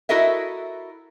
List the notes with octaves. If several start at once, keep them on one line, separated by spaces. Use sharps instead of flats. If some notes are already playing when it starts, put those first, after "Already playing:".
E4 F#4 A4 A#4 D#5 E5